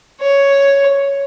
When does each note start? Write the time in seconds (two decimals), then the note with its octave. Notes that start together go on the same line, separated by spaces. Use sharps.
0.20 C#5